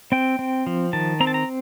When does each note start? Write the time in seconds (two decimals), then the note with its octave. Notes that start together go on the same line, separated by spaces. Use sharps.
0.12 C4 G5
0.39 C4
0.67 F3
0.93 D#3 A5
1.20 C4 A#5
1.27 A5
1.34 A#5